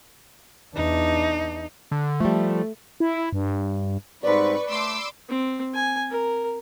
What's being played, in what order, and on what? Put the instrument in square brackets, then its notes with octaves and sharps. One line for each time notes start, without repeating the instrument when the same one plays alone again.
[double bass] E2 D4 [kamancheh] D#4
[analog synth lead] D3
[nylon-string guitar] F3 G3 [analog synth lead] A3
[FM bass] E4
G2
[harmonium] G#2 G3 C4 [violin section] B4 C#6 [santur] D5 B5
[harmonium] A3 [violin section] C6 D6 E6
[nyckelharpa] C4
G#5
A#4